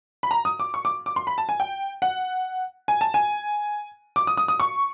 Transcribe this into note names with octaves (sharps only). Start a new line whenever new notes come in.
B5
A#5
D#6
D6
C#6
D6
D6
C6
B5
A5
G#5
G5
F#5
G#5
A5
G#5
D6
D#6
D#6
D#6
C#6